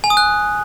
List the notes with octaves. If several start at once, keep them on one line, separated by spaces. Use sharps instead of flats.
G#5
D#6
F#6